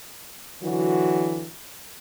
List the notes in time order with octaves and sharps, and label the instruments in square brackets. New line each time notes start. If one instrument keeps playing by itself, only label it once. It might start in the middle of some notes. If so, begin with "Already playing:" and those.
[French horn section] D3 E3 F#3 F#4